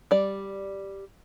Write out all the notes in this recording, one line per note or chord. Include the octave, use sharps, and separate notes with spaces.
G3 D5